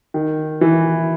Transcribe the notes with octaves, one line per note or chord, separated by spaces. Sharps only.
D#3
E3